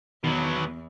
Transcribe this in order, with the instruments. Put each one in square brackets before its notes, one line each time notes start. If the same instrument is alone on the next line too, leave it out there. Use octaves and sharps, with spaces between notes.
[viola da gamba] E2 [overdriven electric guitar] B2 F#3 [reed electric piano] D#3